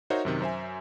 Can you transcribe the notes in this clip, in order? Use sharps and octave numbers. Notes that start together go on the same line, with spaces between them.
D#4 F#4 A#4 C5 C#5 E5
F#2 C3 D#3
F#2 C5 E5 G#5